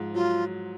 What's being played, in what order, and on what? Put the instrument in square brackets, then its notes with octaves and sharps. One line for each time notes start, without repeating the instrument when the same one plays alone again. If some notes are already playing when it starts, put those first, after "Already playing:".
Already playing: [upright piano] G#2 F3
[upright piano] F#3 [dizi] F4